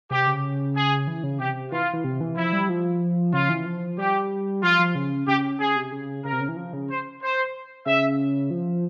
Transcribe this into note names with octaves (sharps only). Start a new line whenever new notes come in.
C3 G4
C#3
G#4
E3
C#3
C3 G4
E3 F4
E3
C3
E3
F3 E4
G3
F3
C#3 F4
E3
F3
G3 G4
F3 F4
F3
C#3
C#3 G4
C#3 G#4
C3
C#3
C#3 A#4
C3
C#3
E3
F3
C#3
C5
C5
C#3 E5
F3